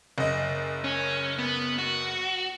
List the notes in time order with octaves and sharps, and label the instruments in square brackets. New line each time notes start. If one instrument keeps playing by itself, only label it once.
[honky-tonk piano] F#1 D#5
[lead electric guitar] C#4
B3
F#4